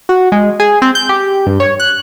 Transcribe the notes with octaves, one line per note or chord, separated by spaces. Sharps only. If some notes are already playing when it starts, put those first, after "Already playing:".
F#4
G#3
G#4
C4
G6
G4
G2
C#5
F#6